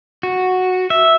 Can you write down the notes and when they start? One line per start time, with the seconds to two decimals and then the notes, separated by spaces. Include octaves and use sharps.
0.23 F#4
0.90 E5